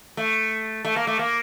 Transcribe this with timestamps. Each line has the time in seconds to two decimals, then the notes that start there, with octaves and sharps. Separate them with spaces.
0.17 A3
0.85 A3
0.96 A#3
1.07 A3
1.19 A#3